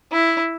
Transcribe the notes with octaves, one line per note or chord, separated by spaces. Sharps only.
E4